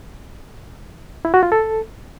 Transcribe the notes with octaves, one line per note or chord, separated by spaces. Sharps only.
E4
F#4
F4
A4